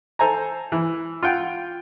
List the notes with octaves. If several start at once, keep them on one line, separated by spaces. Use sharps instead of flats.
A4 C5 G#5 A#5
E3
F4 F#5 G5